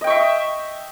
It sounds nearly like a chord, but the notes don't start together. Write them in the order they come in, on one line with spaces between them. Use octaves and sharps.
D#5 G5 C#6 E5